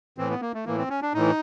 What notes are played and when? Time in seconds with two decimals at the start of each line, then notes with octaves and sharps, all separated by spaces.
0.18 A2 E3 C4
0.30 B3
0.41 A#3
0.54 A3
0.65 A2 E3 A#3
0.78 C4
0.89 C#4
1.02 D4
1.14 A2 E3 D#4